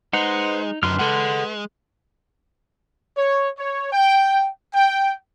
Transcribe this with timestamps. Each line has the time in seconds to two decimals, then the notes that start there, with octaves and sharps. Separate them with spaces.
0.13 G#3 D#4 B4 C5 F#5
0.83 F#2 D3 D#4 B4 C6 F6
0.99 G#3 A4 F#5
3.17 C#5
3.59 C#5
3.92 G5
4.75 G5